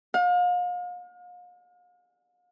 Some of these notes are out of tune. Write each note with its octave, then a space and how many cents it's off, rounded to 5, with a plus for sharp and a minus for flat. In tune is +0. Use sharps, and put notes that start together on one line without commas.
F5 +40